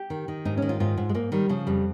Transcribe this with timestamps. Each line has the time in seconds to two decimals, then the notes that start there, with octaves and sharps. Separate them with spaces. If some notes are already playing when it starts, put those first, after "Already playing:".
Already playing: G4
0.10 D#3
0.28 D#3
0.45 G#2 D#4
0.57 D#3 C#4
0.69 F4
0.80 G#2 F4
0.97 G#2
1.09 G#3
1.14 G#2 A#3
1.32 D#3 G3
1.49 C#3 F3
1.67 F2 G3